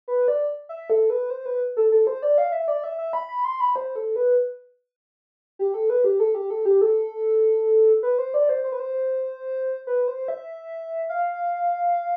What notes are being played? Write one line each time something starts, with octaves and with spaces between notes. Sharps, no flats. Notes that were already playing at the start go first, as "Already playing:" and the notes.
B4
D5
E5
A4
B4
C5
B4
A4
A4
C5
D5
F5
E5
D5
E5
E5
B5
B5
C6
B5
C5
A4
B4
G4
A4
B4
G4
A4
G4
A4
G4
A4
B4
C5
D5
C5
C5
B4
C5
B4
C5
E5
F5